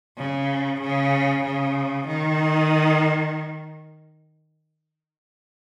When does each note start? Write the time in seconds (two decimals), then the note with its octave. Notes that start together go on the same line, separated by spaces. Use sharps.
0.18 C#3
0.81 C#3
1.45 C#3
2.08 D#3